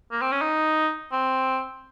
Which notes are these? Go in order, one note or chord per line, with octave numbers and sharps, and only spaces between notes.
A#3
C4
C#4
D#4
C4